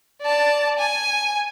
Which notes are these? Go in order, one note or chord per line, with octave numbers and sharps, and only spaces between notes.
D5 A5
G#5